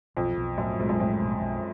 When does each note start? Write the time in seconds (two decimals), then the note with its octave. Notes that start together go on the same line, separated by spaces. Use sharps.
0.17 B1 F2
0.38 B1
0.57 F#2 A2
0.79 B1 G#2
0.89 F#2
1.00 F2 A2
1.21 B1
1.41 B1